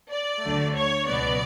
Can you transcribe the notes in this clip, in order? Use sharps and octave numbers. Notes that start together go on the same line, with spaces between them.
D5
D2 D3 F#3 A3
C#5
C#2 B2 F#3 B3 D5